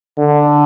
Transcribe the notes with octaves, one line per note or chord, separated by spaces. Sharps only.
D3